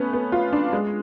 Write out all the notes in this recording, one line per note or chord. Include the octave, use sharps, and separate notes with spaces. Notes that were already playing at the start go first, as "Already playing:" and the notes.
Already playing: A3 B3 C#4
B3
F4
D4
G#3